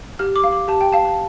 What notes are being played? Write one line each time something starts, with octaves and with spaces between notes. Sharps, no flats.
G4 F6
D6
F5
D6
G4 A5
G5
F5 A5
A5